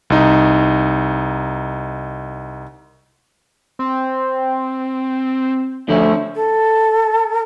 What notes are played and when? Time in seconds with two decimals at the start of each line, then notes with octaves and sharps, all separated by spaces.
0.10 C2 D#4
3.79 C4
5.88 D3 F3 A3 C#4
6.35 A4